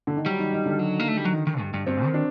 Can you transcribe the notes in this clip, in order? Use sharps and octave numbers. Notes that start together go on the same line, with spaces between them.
D3
D#3
F#3 G3
D#3
D#3
D3
F#3
A#3
A3
G3
F#3
D#3
D#3
G2
G2
G2 C4
D#3
D4